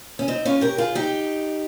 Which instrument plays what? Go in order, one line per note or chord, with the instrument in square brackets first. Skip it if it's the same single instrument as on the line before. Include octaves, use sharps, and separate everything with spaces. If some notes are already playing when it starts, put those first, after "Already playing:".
[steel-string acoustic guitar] C#4
C4 D#4
C#4 F4
G4 A#4
F4 G#4
D#4 G4